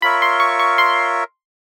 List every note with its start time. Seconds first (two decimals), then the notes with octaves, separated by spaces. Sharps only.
0.02 F4 A#4 C#5 E5 B5
0.22 C6
0.40 C#6
0.59 C#6
0.78 C6